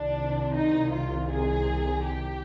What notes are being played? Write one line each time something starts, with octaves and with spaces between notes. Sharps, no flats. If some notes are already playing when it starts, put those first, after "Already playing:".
Already playing: C2 C3 D#3 D4
D#4
F4
G#4
G4